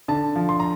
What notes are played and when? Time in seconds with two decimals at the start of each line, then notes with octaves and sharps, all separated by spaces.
0.08 D3 A5
0.36 F3
0.49 C6
0.60 A#5